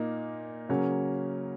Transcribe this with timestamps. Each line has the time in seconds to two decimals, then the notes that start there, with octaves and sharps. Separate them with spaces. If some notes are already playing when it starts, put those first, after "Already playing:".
Already playing: A#2 A#3 D#4
0.69 C#3 F#3 A#3 C#4